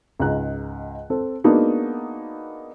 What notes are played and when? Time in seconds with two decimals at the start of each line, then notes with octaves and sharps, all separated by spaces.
0.20 C#2 G#2 A#5 F#6
1.10 C4 A4
1.44 G#3 A#3 B3 D4 D#4 F#4